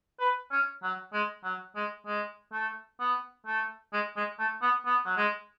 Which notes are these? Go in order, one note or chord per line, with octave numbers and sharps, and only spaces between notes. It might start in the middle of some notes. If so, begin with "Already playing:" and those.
B4
C#4
F#3
G#3
F#3
G#3
G#3
A3
B3
A3
G#3
G#3
A3
B3
B3
F#3
G#3